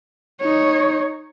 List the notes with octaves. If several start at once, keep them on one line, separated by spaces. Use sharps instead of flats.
D#4 C#5